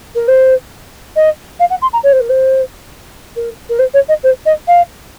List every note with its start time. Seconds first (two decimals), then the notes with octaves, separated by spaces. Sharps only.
0.15 A#4
0.27 C5
1.16 D#5
1.59 F5
1.70 F#5
1.81 C6
1.93 A#5
2.03 C#5
2.12 C5
2.20 A#4
2.29 C5
3.36 A#4
3.69 A#4
3.79 C5
3.93 C#5
4.08 D#5
4.23 C5
4.45 D#5
4.67 F5